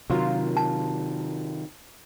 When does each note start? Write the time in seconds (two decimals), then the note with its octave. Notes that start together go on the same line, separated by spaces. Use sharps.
0.10 C3 D#3 F#3 F4 A#4
0.57 A5